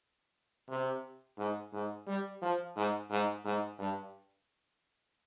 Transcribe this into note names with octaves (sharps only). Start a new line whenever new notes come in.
C3
G#2
G#2
G3
F3
G#2
G#2
G#2
G2